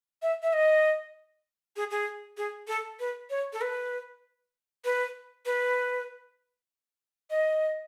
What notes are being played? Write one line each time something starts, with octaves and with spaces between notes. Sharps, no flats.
E5
E5
D#5
G#4
G#4
G#4
A4
B4
C#5
A4
B4
B4
B4
D#5